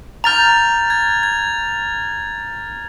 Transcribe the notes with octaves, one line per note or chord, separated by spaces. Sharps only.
A#5 F6 G6 A6 F7
G#6
G#6